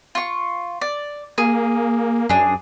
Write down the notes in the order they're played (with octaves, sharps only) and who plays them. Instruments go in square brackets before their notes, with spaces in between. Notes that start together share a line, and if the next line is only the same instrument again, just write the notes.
[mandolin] F4 C#6
D5
[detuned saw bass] A#3 [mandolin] G#4
[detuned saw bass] F#2 [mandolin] D4 G#4